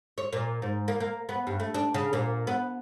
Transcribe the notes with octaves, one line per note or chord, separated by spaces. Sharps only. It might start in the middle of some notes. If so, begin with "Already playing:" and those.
C#5
A#2
G#2
A#3
A#3
B3
G2
A3
D4
C#3
A#2
B3